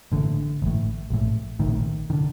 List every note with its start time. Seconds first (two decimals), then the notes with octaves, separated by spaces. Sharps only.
0.12 A1 A2 D3
0.62 A1 A2
1.10 A#1 A2
1.59 A#1 A2 D#3
2.10 D#3
2.13 D3